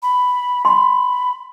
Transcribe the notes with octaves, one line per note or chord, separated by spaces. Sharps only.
B5
B5 C6